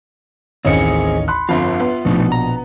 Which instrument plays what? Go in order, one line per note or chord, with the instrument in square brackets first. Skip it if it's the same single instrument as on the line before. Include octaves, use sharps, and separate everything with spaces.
[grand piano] A1 D#2 [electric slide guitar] C4 G#4 [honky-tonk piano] C#4 D#5 C#7
[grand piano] B5 C6 F#6
[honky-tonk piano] G1 F2 [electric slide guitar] F4 E5
[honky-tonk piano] B3
[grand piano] A#1 B2 [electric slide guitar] F3 A3 D#4
[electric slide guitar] A#5